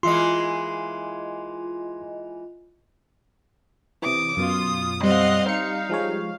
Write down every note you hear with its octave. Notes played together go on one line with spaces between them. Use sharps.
E3 G#3 A#3 F4 D#5 C6
C3 E3 D6 D#6
F#2 B2 F4 D#6
G3 C4 D#5 F5 F#5 C6
D#4 F5 C#7
F3 G#3 C#5